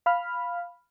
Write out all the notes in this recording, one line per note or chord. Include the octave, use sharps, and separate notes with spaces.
F5 B5 F6